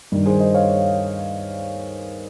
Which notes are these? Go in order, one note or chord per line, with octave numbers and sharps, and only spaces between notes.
G2 D#3 G3
G#4 C5
C5 D#5
C#5 F5